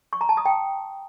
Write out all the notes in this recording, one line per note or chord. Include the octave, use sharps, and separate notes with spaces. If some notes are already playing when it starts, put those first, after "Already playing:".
C#6
A#5
A5
D#6
G5